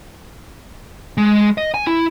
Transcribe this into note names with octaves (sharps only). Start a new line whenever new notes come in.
G#3
D#5
G#5
E4